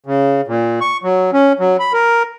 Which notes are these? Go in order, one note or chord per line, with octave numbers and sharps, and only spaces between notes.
C#3
A#2
C#6
F#3
C#4
F#3
B5
A#4